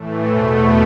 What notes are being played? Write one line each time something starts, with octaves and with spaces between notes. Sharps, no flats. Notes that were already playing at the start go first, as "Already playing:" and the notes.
Already playing: A2 E3 A3
E2 B2 A3 C5